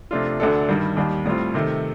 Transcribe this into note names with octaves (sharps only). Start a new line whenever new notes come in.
C3 F3 A3 D4 F4
D2 D3 A3 D4 A4
G2 D#3 G3
D#2 D#3 G3
A2 G3 C4 F4
C3 D#3 A3